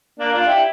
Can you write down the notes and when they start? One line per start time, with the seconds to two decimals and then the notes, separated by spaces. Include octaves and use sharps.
0.19 A#3 D4
0.33 D4 F4
0.47 E4 G4